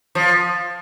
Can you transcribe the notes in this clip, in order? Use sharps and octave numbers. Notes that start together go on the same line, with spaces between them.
F3